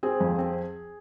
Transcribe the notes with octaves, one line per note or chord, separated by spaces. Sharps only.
C4 G#4
F2
C4